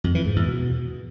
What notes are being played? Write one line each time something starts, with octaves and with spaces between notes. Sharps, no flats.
F2
E3
G#2
E2
B2